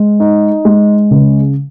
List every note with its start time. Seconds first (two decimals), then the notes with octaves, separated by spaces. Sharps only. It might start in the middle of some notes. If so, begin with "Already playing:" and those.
Already playing: G#3
0.20 D#4
0.65 G#3
1.11 C#3